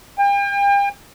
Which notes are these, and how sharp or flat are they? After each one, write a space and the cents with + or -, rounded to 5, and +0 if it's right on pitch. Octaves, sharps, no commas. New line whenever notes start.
G5 +40